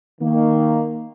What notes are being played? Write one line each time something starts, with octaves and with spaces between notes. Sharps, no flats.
D#3 A#3